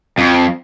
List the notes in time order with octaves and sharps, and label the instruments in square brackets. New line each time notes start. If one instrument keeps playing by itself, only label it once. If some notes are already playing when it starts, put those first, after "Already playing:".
[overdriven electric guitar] F2